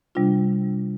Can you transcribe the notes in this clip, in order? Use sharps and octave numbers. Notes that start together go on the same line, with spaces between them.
C3 G3 D4 F4